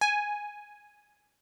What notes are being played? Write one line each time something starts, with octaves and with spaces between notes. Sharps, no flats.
G#5